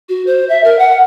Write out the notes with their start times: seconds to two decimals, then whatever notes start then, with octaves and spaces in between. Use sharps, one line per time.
0.09 F#4
0.27 C5
0.49 E5
0.64 A#4
0.79 F#5